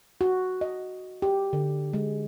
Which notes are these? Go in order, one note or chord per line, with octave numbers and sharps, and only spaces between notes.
F#4
D#5
G4
D3
G#3